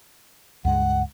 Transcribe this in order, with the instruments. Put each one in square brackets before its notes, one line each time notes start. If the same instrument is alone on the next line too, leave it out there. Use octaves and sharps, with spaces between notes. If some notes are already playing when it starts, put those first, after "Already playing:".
[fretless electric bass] C#2 G2 G#3 [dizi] F#5